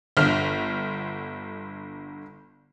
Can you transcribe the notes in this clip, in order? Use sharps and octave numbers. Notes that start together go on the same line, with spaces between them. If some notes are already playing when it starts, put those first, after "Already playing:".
G1 D3 F6